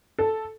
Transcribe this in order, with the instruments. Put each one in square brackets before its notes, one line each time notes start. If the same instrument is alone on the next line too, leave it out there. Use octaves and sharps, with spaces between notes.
[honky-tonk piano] A4